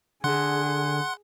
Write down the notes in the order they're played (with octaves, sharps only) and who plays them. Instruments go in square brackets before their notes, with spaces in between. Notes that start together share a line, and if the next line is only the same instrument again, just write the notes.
[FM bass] D3 [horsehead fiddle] G#4 [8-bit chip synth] F#5 C6 F#6